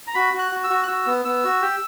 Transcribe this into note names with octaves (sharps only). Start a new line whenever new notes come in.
A#5
F#4 B5
F#4
F#6
F#4
E6
F#4
F#6
F#4 E6
B3
B3 E6
F#4
G4